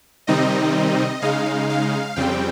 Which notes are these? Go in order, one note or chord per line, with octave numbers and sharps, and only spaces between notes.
C3 D#3 G3 C4 D#4 D#5
C#3 G#3 D#4 F5
F5
F2 C#3 G3 C4 G5